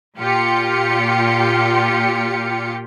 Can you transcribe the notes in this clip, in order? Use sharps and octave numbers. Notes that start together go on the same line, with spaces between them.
A#2 F4 G4 C#7